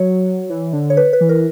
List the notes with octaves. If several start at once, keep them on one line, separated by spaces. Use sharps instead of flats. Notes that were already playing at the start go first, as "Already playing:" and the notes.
Already playing: F#3 C#5
E3
D3
C#5
B4
B4
E3
A#4